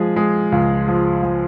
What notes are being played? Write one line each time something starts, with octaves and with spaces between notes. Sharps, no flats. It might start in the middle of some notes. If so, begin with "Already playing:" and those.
Already playing: F3 G#3 G#4
G#3
C#2
F3
F3